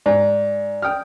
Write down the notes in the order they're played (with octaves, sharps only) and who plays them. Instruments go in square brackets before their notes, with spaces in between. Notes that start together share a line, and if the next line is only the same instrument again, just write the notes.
[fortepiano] G#2 [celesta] D5
[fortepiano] G5 D#6 F6